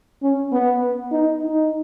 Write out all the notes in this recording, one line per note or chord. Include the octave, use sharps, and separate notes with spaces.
C#4
B3
D#4
D#4